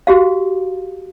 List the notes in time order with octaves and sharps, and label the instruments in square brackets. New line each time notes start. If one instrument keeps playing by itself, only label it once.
[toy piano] F#4 G4 F5